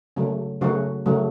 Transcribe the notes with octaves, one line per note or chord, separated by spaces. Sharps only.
C#3 F#3 A3 C#4
C#3 F#3 A3 C#4 F#4
C#3 F#3 A3